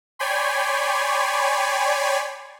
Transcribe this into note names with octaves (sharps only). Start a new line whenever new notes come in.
C#5 D5 G5 G#5 B5 C6